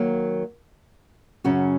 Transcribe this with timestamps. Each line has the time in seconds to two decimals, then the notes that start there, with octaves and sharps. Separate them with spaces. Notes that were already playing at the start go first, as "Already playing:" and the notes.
Already playing: D#3 F#3 A#3
1.44 F#2 C#3 F#3 C#4 F#4